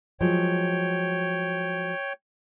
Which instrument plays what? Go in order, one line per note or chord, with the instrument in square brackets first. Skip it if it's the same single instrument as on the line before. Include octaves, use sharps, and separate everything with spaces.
[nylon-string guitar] F3 F#3 G#3 [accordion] C#5 G5